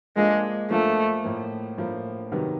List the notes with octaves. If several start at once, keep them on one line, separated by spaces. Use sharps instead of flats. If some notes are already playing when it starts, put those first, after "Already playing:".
F3 G#3 A#3 D4 F4 A4
F3 A3 A#3 D4 F4 A4
A2 F3 A#3
A2 F3 A#3
C3 D#3 F#3 B3